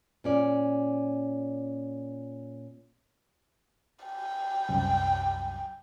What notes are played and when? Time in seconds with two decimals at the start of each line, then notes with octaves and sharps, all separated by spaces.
0.24 A#2 C#4 D5
4.06 G5
4.69 C2 F#2